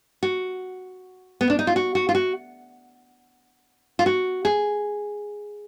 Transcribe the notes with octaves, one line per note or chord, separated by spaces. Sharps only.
F#4
B3
D4
D#4
F4
F#4
F#4
F4
F#4
F4
F#4
G#4